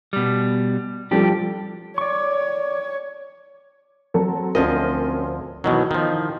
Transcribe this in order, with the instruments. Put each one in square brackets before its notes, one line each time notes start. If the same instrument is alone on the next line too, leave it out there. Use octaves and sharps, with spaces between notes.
[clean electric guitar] B2 G3
[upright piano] F3 G3 A4 [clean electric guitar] D4 G4
[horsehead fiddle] C#5 [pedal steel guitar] D5 C#6
[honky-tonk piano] F#3 C4 A4
[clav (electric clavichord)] D2 F3 D#5 [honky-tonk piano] C4 C#4 A#4
[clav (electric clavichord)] B2 D#3 F#3 [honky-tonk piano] E3 D#4
[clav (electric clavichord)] D#3 F3